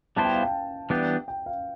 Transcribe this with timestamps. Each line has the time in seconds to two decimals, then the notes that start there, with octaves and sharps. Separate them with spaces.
0.16 G3 B3 E4 G4 C5 A5
0.25 G5
0.34 F5
0.43 G5
0.90 E3 G3 B3 D4 G4
1.28 G5
1.46 F5